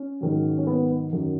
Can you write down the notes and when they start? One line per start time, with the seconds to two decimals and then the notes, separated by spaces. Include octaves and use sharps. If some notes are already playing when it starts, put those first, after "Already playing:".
Already playing: C#4
0.21 G#2 D#3 F#3
0.58 C#4
0.67 B3
1.12 F#2 D#3 F#3